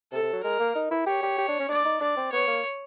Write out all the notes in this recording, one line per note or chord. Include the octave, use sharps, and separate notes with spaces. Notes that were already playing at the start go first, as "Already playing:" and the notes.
C3 A4
C3
F#3
G#3 A#4
A#3
D#4
E4
G4 C#5
G4
G4
D4
C#4
D4 D5
D#4
D4 D5
C4
B3 C#5
A#3